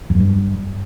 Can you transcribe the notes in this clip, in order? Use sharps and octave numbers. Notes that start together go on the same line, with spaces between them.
F2
F#2
G2